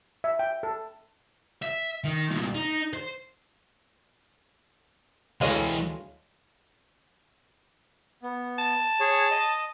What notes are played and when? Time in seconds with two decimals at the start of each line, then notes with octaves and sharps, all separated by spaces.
0.24 E5
0.39 G5
0.63 A4
1.62 E5
2.04 D#3
2.30 C2 A#2
2.55 D#4
2.93 C5
5.41 D2 E3 G#3 A4 C#5 D#5 F5
8.23 B3
8.59 A5
9.00 G#4 C#5
9.31 D#5